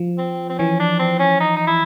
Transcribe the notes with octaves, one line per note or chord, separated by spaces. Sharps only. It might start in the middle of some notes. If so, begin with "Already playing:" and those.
Already playing: F3
C4
C4
E3 C#4
D4
C4
C#4
D#4
D#4
E4